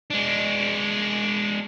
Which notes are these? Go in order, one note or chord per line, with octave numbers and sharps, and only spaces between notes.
G#3 D4